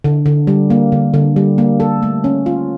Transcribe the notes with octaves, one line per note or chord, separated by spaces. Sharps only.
D3
D3
G3
A#3
D3
D3
G3
A#3
A4
A3
C#4
F4